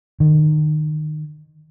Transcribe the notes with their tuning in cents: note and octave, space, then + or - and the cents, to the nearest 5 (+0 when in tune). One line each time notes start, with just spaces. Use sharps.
D#3 -25